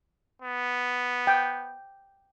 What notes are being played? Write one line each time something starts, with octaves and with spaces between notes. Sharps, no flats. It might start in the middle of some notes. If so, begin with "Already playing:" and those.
B3
G5